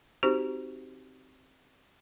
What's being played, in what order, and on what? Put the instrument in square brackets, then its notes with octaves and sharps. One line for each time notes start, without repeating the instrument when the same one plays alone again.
[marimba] C4 D#4 F#4 G4 C5